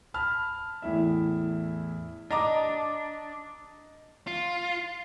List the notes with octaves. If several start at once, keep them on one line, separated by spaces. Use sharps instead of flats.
A5 B5 F6
E2 A2 E4 E5
D4 D#5 A#5 D6
F4